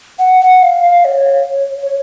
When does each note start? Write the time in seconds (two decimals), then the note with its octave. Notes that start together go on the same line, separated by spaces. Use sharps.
0.19 F#5
0.41 F#5
0.62 F5
0.83 F5
1.05 C#5
1.77 C#5